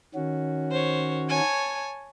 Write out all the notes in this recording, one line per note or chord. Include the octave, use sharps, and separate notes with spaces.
D#3 C#4 F#4
C5 C#5
C#5 G#5 A5